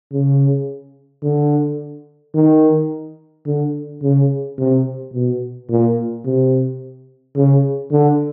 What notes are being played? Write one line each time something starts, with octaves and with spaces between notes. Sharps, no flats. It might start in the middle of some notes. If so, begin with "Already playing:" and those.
C#3
D3
D#3
D3
C#3
C3
B2
A#2
C3
C#3
D3